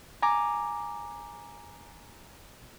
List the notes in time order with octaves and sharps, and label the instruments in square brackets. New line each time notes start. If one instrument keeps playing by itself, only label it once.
[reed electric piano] G#5 A#5 D6